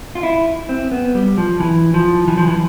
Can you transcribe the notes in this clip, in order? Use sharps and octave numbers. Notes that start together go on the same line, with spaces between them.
F4
E4
C4
B3
G3
F3
E3
F3
E3
F3
E3